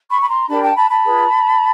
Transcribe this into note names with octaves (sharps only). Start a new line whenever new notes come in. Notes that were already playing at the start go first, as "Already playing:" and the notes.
B5 C#6
B5
A#5 C6
D4 G4 A#4 A5 B5
G5 A5
A5 B5
A5 B5
F4 G#4 B4